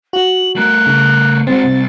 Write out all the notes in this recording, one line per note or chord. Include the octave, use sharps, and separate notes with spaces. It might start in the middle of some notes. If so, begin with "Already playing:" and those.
F#4 F#7
A3 A#4 F#6
C#3
G#3 C4 F#4 A6
C2